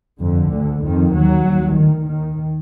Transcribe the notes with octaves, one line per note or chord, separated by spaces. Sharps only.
F2 D3
D2
F2 D#3
D#2 F#3
D#2
D2 D#3
D#2 D#3